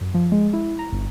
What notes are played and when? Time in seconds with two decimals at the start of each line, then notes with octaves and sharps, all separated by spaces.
0.01 F#2
0.14 F3
0.32 G#3
0.53 E4
0.79 A#5
0.93 G1